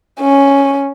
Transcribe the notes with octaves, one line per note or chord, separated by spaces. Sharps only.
C#4